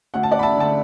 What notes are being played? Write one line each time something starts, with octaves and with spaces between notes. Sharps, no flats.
D2 F#5
A5
D5 F#5
B5
E5 A5
D3 A3 A5